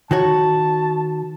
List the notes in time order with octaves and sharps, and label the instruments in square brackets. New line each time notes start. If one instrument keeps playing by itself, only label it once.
[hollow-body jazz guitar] D#3 F#4 C#5 [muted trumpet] A5